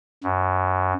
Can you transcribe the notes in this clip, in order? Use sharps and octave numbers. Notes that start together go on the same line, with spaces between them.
F#2